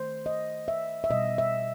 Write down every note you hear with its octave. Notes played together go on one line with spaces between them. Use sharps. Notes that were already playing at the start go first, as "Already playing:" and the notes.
Already playing: D#3 A3 C5
D#5
E5
E5
B2 G3 D#5
E5